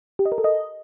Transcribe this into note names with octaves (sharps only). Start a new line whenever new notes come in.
G4
D#5
A#4
A4
D#5